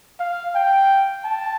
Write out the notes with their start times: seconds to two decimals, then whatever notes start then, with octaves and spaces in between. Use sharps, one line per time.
0.19 F5
0.55 G5
1.25 A5